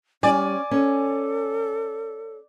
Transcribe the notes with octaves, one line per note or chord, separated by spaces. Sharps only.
G3 C#4 D5 G#5
C#4 A4